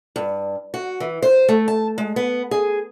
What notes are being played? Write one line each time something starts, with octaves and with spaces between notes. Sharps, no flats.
G2
F#4
E3
C5
A3
A5
G#3
B3
G#4